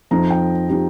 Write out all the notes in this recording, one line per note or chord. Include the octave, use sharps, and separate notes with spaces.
F2 F3 C4 D#4 A#5
G5
F3 C4 D#4 G4